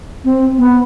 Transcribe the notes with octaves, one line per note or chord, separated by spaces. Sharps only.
C4
B3